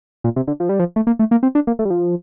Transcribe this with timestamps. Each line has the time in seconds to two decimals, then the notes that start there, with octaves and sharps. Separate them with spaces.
0.24 A#2
0.36 C3
0.48 D3
0.60 F3
0.69 G3
0.79 F3
0.96 A3
1.07 A#3
1.19 A3
1.31 A#3
1.43 C4
1.55 D4
1.67 A#3
1.79 A3
1.85 G3
1.90 F3